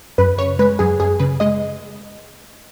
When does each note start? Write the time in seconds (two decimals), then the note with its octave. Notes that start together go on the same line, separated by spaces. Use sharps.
0.18 F#2 B4
0.38 C#3 C#5
0.59 G#3 B4
0.79 F#2 G#4
1.00 F#2 G#4
1.20 C#3 B4
1.40 G#3 D#5